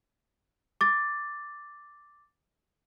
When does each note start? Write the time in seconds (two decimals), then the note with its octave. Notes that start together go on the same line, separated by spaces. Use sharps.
0.81 D6 A6